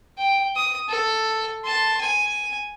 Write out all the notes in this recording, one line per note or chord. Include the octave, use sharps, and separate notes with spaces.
G5
D#6
A4
A5 C6
G#5